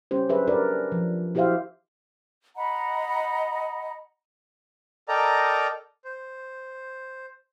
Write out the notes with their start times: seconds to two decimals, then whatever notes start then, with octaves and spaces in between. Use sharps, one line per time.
0.11 G3 C#4 G4 C5
0.29 F#3 D4 G#4 B4 C5 E5
0.47 D4 G4 A#4 B4 D5
0.92 F3
1.35 E4 F#4 G4 C5 E5 F5
2.56 D#5 F#5 A#5 B5
5.09 A4 A#4 D5 D#5 G5 A#5
6.05 C5